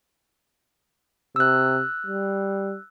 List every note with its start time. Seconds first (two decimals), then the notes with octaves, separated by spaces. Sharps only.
1.36 C3 E6 F#6
2.06 G3